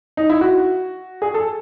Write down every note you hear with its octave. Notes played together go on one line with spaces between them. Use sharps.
D#4
E4
F#4
G#4
A4